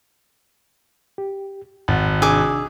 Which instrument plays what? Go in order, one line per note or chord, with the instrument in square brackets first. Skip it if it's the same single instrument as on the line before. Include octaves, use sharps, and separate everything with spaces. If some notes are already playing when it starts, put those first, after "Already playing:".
[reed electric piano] G4
[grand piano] G#1 [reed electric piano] F2 F#5 A6
[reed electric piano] C3 D4 E6 [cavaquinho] G#4 D6